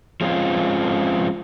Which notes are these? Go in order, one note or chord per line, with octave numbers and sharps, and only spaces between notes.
F3 G#3 C4 C#4 F4